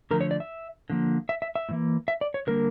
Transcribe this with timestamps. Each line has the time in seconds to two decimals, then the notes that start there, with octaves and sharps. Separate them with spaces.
0.11 D3 F3 A3 A#4
0.21 C#5
0.31 D5
0.40 E5
0.90 D3 F3 A#3
1.29 E5
1.42 E5
1.55 E5
1.69 A2 E3 A#3
2.08 E5
2.21 D5
2.34 C#5
2.47 D3 G3 A#3 A#4